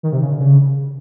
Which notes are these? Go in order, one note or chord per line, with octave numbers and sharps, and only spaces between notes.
D#3
C3
C#3
D3
C#3